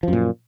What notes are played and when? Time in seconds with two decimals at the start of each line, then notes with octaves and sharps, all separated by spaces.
0.03 F3
0.08 F#2
0.13 A#2